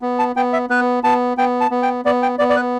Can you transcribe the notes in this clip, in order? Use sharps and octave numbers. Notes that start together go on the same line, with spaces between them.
B3
A5
B3 G5
E5
B3 B4
B3 A5
B3 G5
A5
B3
G5
B3 D5
G5
B3 D5
D5
B4